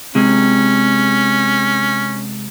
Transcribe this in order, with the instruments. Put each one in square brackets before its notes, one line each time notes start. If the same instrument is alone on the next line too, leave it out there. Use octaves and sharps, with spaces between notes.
[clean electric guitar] C3 G#3 [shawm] C#4